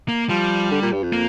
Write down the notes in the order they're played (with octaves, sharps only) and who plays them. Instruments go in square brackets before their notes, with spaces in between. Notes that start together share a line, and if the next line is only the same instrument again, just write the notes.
[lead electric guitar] A#3
[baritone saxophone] F3 [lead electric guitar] G3
[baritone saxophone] D3
A#2
G2
F2
[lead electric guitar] A#3